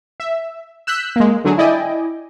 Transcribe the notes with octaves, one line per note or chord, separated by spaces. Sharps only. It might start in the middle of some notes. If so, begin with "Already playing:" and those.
E5
E6 F#6 G6 B6
G#3 A#3
D3 F#3 G#4
E4 D5 D#5 G5 G#5